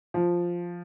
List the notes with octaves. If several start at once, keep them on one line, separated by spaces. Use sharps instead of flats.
F3